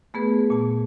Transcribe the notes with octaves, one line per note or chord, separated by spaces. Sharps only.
A3 B3 G#4 B4
A#2 A5